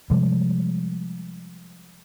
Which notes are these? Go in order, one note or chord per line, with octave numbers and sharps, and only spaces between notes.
C3 F3 G3 G#3